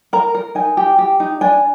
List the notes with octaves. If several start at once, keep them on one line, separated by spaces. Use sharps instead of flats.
A#4 A#5
A#4
D#4 G#5
G4
G4
D#4
D4 G#5